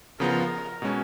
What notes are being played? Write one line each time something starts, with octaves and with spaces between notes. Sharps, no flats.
C#3 F3 B3 F4 A#4
B2 G#3 C#4